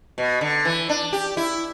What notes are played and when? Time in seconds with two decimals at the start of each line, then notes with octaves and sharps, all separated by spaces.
0.18 B2
0.41 D3
0.65 E3
0.89 D4
1.13 G4
1.37 E4